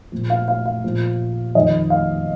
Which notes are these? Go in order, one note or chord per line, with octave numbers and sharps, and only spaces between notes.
A#2 F3
F5
F5
F5
A#2 F3
F2 D#3 D#5
F5